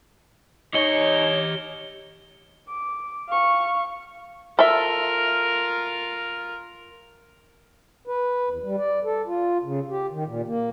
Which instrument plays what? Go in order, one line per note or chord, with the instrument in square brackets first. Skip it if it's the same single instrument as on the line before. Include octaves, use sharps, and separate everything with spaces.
[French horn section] D#4 [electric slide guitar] G4 D#5 [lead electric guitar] C#5 [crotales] C#7 G7
[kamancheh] D6
F5 C#6
[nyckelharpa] F4 A#4 [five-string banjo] A4 E5
[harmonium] B4
E2
G3
D5
A4
F4
C#3
G4
D#3
A#2
A#3